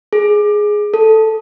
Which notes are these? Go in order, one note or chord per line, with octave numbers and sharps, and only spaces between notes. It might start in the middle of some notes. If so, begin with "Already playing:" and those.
G#4
A4